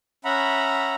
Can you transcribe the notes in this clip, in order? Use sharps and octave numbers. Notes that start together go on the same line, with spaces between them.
C#4 E5 F#5 A#5 B5